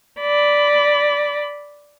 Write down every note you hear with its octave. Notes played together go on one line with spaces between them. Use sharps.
D5 B5